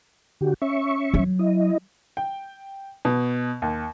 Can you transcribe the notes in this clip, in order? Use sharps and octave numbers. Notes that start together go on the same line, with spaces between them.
D3 F#4 G4
C#4 E5 C#6
F#3
E4 D#5
G5
B2
D#2